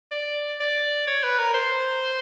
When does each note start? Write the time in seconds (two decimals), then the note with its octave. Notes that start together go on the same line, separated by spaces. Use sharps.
0.12 D5
0.60 D5
1.07 C#5
1.23 B4
1.39 A#4
1.54 C5